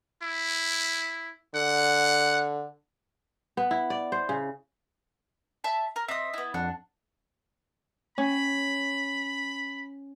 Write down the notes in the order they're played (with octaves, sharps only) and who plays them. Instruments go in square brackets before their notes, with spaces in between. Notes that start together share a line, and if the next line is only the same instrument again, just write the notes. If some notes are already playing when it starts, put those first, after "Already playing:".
[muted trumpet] E4
[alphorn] D3 [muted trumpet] F#5
[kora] B3
E4
D5
C5
C#3
[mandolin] E5 A5 B5
A#4
[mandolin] C4 D#6 [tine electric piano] D#5 E5
[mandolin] B3 E4
[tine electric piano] F2 F#5 [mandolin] D4
[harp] C#4 [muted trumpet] B5